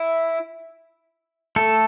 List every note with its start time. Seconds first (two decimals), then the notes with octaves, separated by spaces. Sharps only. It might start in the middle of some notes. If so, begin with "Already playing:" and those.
Already playing: E4
1.56 A3 A4